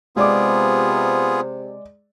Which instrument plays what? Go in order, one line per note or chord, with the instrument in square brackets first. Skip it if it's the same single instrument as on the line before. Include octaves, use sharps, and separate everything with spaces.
[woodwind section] C3 [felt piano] G#3 D5 D6 [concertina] B3 F4 G#4